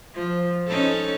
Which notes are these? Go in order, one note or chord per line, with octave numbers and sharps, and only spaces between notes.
F3
C#4 D#4 A4